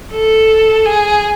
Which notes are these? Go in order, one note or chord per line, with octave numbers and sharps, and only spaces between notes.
A4
G#4